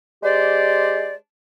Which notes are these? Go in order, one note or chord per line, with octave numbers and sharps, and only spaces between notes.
G#3 G4 C5 D5